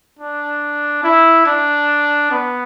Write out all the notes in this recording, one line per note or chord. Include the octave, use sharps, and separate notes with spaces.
D4
E4
D4
B3